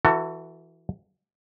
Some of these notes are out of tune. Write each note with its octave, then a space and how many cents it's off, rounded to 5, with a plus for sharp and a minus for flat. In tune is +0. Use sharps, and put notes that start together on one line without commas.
E3 +0 F#4 +0 A4 +30